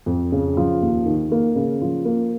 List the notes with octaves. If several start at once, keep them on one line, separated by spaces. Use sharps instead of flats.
F2
C#3
F3
D#2
D#3
A#3
C#3
F3
A#3